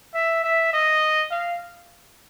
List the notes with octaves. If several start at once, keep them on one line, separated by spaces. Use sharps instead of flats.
E5
E5
D#5
F5